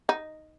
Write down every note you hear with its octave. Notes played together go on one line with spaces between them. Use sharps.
D#4